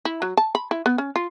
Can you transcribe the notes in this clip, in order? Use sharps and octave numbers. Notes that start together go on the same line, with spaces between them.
E4
F#3
A5
B5
E4
B3
C#4
F4